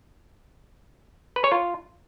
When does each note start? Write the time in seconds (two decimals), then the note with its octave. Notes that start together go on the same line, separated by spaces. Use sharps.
1.36 B4
1.44 C#5
1.52 F4